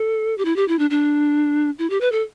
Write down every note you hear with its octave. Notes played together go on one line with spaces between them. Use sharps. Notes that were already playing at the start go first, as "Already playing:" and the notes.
Already playing: A4
G4
E4
G4
E4
D4
D4
E4
G4
B4
A4